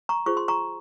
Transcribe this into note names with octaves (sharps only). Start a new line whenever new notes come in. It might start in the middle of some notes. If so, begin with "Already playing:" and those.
A#5 C#6
F4 G#4 C5 C#6
C6
A#5 C#6